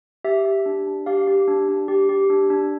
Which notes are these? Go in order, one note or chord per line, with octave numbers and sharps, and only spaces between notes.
G4 E5
G4
D4
D4
G4 F5
G4
D4
D4
G4
G4
D4
D4